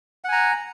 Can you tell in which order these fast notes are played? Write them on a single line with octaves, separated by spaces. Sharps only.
F#5 G#5 A#5